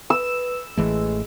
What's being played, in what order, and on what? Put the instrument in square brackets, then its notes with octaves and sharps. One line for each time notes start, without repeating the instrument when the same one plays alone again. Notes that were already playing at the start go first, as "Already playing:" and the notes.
[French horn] B4 [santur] E6
[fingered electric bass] A1 E3 A3 [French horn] G#3